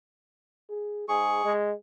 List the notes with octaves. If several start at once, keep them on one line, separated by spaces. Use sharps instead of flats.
G#4
G#2 G#4 C#6
G#3